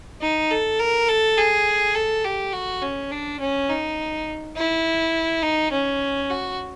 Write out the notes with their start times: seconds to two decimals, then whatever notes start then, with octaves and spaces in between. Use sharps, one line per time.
0.21 D#4
0.50 A4
0.80 A#4
1.09 A4
1.38 G#4
1.95 A4
2.24 G4
2.53 F#4
2.82 C#4
3.11 D4
3.40 C#4
3.69 D#4
4.56 E4
5.43 D#4
5.72 C#4
6.30 F#4